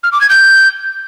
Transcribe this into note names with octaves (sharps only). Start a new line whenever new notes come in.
F6
D6
G#6
G6